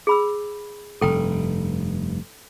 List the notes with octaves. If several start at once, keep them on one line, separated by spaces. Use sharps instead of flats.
G#4 B5 E6
F1 G2 A4 G5